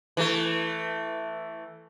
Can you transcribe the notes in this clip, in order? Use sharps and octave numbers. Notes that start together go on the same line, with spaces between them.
E3 A3